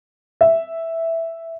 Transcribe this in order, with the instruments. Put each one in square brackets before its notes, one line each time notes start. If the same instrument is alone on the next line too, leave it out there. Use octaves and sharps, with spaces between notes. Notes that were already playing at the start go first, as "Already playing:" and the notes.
[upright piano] E5